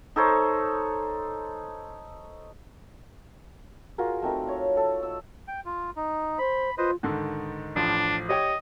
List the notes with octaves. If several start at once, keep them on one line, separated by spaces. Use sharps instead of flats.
D#4 A4 C5 C#5
F4 F#4 G#4 A#4
A3 C4 D#4 A#4
D#4 C#5
A4
E6
G5
F4
D#4
C5 B5
F4 B4 C5 D#5
G#2 D3 D#3
A1 F3 D4
G4 C#5 D#5 G5